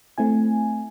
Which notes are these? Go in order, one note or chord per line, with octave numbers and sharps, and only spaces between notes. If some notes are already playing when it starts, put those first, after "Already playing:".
A3 C4 E4 G#5